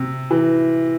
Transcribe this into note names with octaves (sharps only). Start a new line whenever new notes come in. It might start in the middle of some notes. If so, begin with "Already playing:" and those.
Already playing: C3
E3